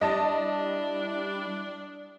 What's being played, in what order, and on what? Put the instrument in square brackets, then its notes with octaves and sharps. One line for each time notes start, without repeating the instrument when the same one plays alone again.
[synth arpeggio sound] G3 E4 [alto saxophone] D4 [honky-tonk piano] D#5 A5